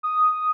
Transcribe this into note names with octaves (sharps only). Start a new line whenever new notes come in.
D#6